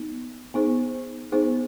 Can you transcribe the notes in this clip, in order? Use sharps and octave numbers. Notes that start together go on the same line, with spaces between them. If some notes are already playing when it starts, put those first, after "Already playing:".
Already playing: B3 D#4
B3 D#4 G#4 C5
B3 D#4 G#4 C5